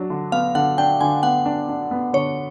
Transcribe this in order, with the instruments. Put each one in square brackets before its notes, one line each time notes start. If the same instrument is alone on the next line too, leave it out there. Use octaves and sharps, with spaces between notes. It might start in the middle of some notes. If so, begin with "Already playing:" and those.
Already playing: [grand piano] F#3 D4
D3
[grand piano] B3 [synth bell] F5
[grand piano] D3 [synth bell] F#5
[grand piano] D4 [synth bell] G5
[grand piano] D3 [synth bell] G#5
[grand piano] B3 [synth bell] F#5
[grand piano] D4
D4
B3
[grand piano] D3 [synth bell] C#5